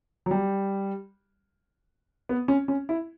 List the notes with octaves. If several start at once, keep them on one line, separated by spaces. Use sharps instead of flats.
F#3
G3
B3
C#4
C#4
E4